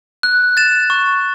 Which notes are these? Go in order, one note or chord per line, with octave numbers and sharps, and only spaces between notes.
F#6
A6 E7
C#6